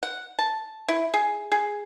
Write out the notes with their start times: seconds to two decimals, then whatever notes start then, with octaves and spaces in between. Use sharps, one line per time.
0.03 F#5
0.39 A5
0.88 E4
1.14 G#4
1.52 G#4